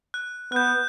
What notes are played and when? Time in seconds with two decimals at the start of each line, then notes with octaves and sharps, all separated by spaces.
0.14 F#6
0.52 B3 F#6 G6